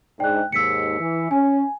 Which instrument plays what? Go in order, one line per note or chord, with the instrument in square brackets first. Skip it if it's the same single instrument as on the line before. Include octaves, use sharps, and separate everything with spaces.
[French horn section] G#2 D4 [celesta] G5 F#6
[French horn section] D#2 G#2 [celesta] E6 B6 C#7
[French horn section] E3
[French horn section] C#4 [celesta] G#5